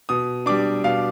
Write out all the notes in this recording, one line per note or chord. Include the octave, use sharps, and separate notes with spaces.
B2 D#6
G3 D4 D6
B2 F5